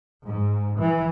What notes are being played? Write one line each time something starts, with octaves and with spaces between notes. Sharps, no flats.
G#2
E3